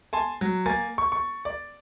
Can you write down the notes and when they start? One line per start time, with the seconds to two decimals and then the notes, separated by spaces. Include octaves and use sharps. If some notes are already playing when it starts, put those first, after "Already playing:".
0.13 G#5 A5 C6
0.41 F#3
0.66 A#3 G#5 A6
0.98 C#6
1.12 C#6
1.45 D5